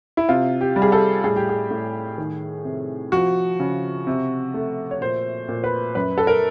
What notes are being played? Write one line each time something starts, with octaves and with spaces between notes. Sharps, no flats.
E4
C3 F4
G4
G3
G#4
A4
A2 G#4
G4
G#4
A2
D#3
C3
F3 F#4
C#3
C3
A3
C#5
A#2 C5
A#2
B4
F#2 B4
A4
A#4